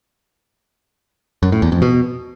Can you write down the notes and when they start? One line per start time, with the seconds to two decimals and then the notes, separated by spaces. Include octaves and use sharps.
1.43 F#2
1.52 A2
1.62 E2
1.72 F2
1.82 B2